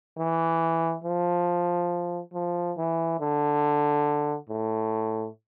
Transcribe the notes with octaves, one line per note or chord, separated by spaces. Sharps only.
E3
F3
F3
E3
D3
A2